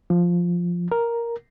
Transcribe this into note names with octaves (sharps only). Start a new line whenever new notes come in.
F3
A#4